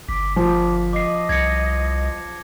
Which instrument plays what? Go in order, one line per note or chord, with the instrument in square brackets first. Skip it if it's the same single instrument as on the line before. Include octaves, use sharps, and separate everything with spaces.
[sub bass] G1 [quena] D6 [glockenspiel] B6
[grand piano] F3 [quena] D6
[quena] D#5 [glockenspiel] D6 C7
[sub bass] C2 [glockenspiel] G#6 A#6 C#7